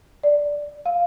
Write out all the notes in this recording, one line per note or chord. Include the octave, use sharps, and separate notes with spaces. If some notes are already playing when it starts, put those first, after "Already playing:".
D5
F5